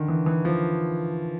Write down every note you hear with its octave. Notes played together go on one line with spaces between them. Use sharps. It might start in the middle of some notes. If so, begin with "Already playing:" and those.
Already playing: D3 D#3
E3
E3
F3